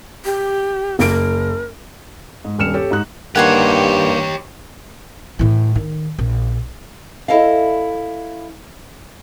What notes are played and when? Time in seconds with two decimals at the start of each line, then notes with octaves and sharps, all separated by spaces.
0.25 G4
0.99 F#1 A#4 D7
2.45 G#2
2.58 D#1 G2 F6 C#7 E7
2.74 G4 A4 C#5
2.91 G#2 D#4 F#6
3.36 G2 D#3 A#3 G4 C#5 F#5 G#5 C6
5.39 A2 E3
5.75 D#3
6.18 A#1
7.28 E4 A4 D#5 F5